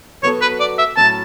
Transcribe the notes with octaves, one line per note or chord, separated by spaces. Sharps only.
F#3 B3 F#4 A4 C#5
B4
D5
E5
A2 F#3 C#4 A5